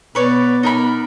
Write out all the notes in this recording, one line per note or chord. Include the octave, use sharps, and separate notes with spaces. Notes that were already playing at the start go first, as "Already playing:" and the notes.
B2 B3 B4 C#5 D5
D#4 A#4 B5